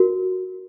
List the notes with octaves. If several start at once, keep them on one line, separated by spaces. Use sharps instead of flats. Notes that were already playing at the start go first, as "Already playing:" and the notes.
Already playing: F#4 A#4